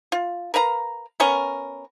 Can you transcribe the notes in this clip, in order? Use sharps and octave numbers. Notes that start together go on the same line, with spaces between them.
F4
A#4 B4 F5 A#5
B3 C#4 A#4 C#6